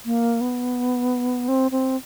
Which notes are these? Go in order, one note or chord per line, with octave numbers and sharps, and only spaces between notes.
A#3
B3
C4
C4